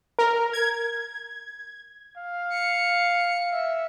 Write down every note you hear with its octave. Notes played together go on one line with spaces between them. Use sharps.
A#4
G#6
F5
C#7
E5